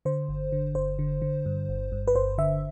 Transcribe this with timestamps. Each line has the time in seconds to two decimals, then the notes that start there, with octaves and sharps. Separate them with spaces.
0.05 D3 C5
0.29 G1
0.52 D3
0.75 G1 C5
0.99 D3
1.22 D3
1.46 G2
1.69 G1
1.92 G2
2.08 B4
2.15 G1 C5
2.38 D3 E5